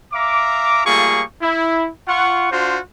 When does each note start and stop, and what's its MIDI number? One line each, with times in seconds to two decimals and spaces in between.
0.13 0.84 76
0.13 0.84 77
0.13 0.84 82
0.13 0.84 86
0.85 1.21 55
0.85 1.21 57
0.85 1.21 58
0.85 1.21 65
0.85 1.21 68
0.85 1.21 85
1.42 1.89 64
2.08 2.48 65
2.08 2.48 78
2.08 2.48 85
2.51 2.79 62
2.51 2.79 65
2.51 2.79 66
2.51 2.79 72